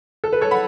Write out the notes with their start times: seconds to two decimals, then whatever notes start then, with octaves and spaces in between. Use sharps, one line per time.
0.24 A4
0.33 B4
0.41 A4 C#5
0.51 F#5 B5